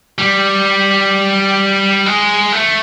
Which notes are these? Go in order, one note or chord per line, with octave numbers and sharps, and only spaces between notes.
G3
G#3
A3